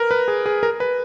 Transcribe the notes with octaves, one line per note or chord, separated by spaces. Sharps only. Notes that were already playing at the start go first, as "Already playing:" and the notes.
Already playing: A#4 B4
B4
G#4
G#4
A#4
B4